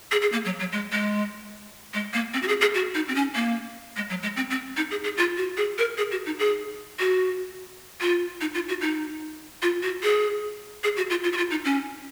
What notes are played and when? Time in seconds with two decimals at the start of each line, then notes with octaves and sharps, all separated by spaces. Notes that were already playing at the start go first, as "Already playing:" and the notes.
0.12 G#4
0.22 G#4
0.32 A#3
0.45 F#3
0.59 F#3
0.72 G#3
0.92 G#3
1.94 G#3
2.13 A#3
2.34 C4
2.43 F#4
2.48 G#4
2.61 G#4
2.74 F#4
2.95 D#4
3.08 C4
3.15 C#4
3.35 A#3
3.97 G#3
4.10 F#3
4.23 G#3
4.36 C4
4.50 C4
4.77 D#4
4.91 G#4
5.04 G#4
5.17 F4
5.37 F#4
5.57 G#4
5.78 A#4
5.98 G#4
6.12 F#4
6.26 D#4
6.39 G#4
7.00 F#4
8.01 F4
8.41 D#4
8.54 F4
8.69 F#4
8.81 D#4
9.62 F4
9.83 F#4
10.03 G#4
10.84 G#4
10.97 F#4
11.10 F4
11.24 F4
11.32 F#4
11.37 F4
11.51 D#4
11.65 C#4